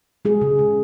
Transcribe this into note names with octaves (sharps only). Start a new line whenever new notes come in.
G#3 G#4
C#3
C#3